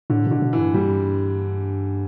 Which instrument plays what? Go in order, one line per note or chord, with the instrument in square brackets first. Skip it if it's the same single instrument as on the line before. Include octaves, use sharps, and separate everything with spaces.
[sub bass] A2 [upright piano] D3
[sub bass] B2 [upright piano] D3
[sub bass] B2
[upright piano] E3
[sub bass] G2
[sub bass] G2 [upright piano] G3